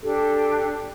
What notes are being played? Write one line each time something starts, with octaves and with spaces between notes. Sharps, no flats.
D4 G4 A4